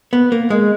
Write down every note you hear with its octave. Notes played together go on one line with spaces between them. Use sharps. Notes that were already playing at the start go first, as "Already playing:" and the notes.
B3
A#3
G#3